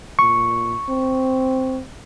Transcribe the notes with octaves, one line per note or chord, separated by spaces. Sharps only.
A#2 C#6
C4